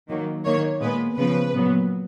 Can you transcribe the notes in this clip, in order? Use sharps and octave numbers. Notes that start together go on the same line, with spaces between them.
D#3 F#3 A#3
D#3 A#3 C#5
A#2 G#3 B3 B4
C#3 F3 B3 B4
A#2 F#3 B3